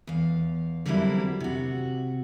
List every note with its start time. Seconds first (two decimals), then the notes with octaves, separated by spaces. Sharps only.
0.07 E2 F5
0.86 D3 F#3 G3 A#3 C4 E4
1.40 C3 F#4